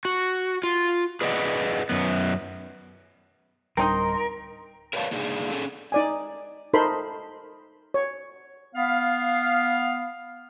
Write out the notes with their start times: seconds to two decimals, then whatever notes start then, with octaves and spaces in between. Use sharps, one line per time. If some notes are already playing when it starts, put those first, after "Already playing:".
0.05 F#4
0.63 F4
1.21 G#4 B4 D5 D#5 F#5
1.89 F#2 B3
3.77 D1 G3 C4 D4 D#4 A#4 D#5 C6
4.93 A#4 B4 C#5 D5 F5 A5
5.11 A#3 D4 D#4 G#4
5.51 C#4 G#4 A4
5.92 D#4 D5 G#5
6.74 D#4 A4 A#4 C5 B5 C6
7.94 C#5
8.75 B3 F5